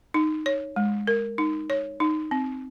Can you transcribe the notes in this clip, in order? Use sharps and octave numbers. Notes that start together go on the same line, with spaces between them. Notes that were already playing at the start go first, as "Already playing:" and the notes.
D#4
C#5
G#3
A#4
D#4
C#5
D#4
C4